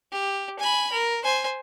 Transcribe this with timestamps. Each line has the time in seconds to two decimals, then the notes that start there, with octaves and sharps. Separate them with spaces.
0.12 G4
0.59 G#5 B5
0.92 A#4
1.24 C5 G#5